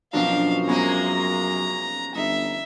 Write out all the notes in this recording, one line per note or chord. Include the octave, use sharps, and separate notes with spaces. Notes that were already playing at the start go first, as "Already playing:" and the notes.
F#2 B2 F3 D4 D#4 F5
C3 G#3 A#3 B3 C#4 A#5
G1 D#4 E5